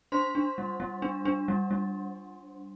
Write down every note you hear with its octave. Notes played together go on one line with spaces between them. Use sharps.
D4 C5 C6
D4
G3
G3
D4
D4
G3
G3